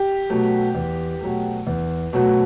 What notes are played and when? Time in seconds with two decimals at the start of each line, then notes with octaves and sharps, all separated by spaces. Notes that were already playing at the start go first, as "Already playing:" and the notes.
Already playing: G4
0.30 B2 F#3 A3
0.75 E2
1.21 B2 F#3 A3
1.67 E2
2.13 B2 F#3 A3